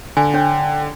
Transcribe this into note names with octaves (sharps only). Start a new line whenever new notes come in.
D3 G#5
D4 C#5 G5